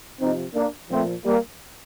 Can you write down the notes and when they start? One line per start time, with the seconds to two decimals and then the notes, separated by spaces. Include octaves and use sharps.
0.20 C3 F3 C4 D#4
0.55 A#3 D4
0.90 A#2 F3 A3 C4
1.25 G3 A#3